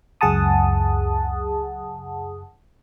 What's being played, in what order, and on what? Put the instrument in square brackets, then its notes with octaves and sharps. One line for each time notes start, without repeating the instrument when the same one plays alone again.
[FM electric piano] C#2 F#2 G#4 F#5 A5 D#6